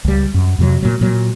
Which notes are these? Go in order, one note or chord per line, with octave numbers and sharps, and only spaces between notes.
C#2 G3
F#2
F2 C3 E3 F#3
A#2 F#3
A#2 F#3